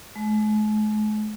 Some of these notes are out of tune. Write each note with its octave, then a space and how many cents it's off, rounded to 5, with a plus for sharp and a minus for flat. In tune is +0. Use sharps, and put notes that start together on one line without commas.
G#3 +45